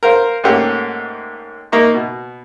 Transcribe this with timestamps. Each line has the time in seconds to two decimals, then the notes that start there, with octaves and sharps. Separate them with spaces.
0.03 A#4 C5 F5
0.44 G#2 A3 A#3 C#4 G4 F#5
1.72 A#3 D#4 E5 C#6
1.94 B2